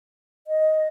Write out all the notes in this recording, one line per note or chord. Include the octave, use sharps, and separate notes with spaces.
D#5